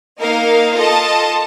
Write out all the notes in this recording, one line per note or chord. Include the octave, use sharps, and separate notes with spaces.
A#3 D#4 A#4 F5
F4 A4 D#5 A5